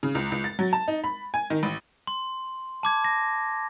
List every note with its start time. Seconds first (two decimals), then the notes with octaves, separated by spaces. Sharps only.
0.03 C#3
0.15 C#2
0.32 C#2
0.44 A6
0.59 F#3
0.73 A5
0.88 D#4
1.04 B5
1.34 G#5
1.50 D#3
1.63 A1
2.07 C6
2.83 A5 D6 G#6
3.05 A#6